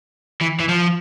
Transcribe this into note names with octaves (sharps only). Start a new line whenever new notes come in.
E3
E3
F3